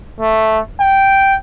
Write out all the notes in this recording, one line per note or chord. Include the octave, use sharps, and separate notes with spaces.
A3
G5